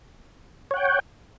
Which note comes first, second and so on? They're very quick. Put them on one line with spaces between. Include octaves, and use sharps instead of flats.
C#5 F#5 G5